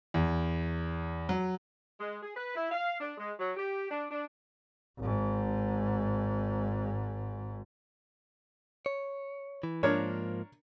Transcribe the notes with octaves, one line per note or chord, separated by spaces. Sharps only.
E2
F#3
G#3
G#4
B4
E4
F5
D4
G#3
F#3
G4
D4
D4
G#1 G#2
C#5
E3
G#2 F3 A#3 D4 A#4 C#5